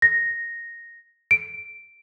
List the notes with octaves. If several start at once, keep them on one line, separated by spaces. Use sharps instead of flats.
A#6
D7